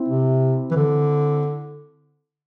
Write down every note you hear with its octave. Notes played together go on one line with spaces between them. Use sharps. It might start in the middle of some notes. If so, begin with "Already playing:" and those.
Already playing: C4 E4
C3
E3
D3